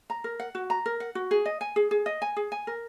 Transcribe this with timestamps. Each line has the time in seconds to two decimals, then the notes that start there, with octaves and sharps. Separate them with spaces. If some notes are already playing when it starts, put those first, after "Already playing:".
0.10 A#5
0.24 A#4
0.40 F#5
0.55 F#4
0.70 A#5
0.86 A#4
1.00 F#5
1.15 F#4
1.31 G#4
1.45 D#5
1.61 G#5
1.76 G#4
1.91 G#4
2.06 D#5
2.22 G#5
2.37 G#4
2.52 G#5
2.67 A#4